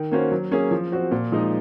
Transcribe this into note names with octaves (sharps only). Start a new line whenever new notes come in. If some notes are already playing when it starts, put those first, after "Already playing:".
Already playing: D#3
A#3 C#4 F#4 C5
F#3
A#3 C#4 G#4
F3
C4 F#4 C5
A#2
F3 G#3 D#4